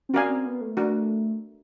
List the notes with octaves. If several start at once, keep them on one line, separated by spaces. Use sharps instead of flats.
C4
C#4 F#4 A#4 D5 F5 G#5
C4
B3
A3
D4 F#4 A#4